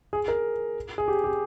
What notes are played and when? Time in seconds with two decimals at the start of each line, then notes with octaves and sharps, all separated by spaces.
0.13 G#4
0.28 A#4
0.98 G#4
1.08 G4
1.24 G4